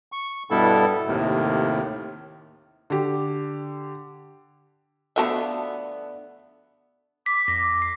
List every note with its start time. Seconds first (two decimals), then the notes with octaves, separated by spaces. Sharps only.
0.12 C#6
0.51 G2 B2 G3 B3 E4 A4
1.07 D#2 A2 C3 D#3
2.90 D3 G4
5.16 D3 F3 A3 B3 F#4 E5 A5
7.26 D6 B6
7.48 F2 A#6
7.82 C7